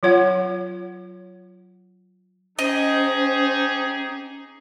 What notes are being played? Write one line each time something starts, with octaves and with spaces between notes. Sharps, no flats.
F#3 F4 C#5 F#5
C#4 D#4 G4 G#4 C5 D#5